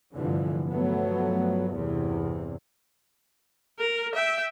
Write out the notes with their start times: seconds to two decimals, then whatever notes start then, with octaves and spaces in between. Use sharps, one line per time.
0.15 F1 G2 D3 E3 F3
0.71 G2 F3 F#3 A3 B3
1.76 E2 G2 C3
3.79 A#4
4.15 E5 G5